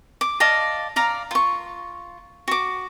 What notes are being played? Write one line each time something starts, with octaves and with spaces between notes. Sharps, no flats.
D6
D5 D#5 F5 A5
D5 F5 A#5
F4 C#6
F#4 D6